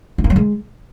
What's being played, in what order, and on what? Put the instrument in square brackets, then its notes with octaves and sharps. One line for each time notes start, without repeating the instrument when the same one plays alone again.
[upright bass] C4
A#3
F#3
G#3